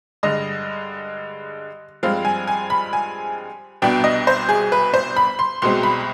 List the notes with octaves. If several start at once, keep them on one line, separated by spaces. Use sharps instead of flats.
G2 D3 G#3 D#5
G2 F3 G#3 C4 F5
G#5
G#5
B5
G#5
C2 B2 B3 D4 G5
D#5
C5
G#4
B4
C5
B5
C6
C2 B2 G#3 C4 C6
B5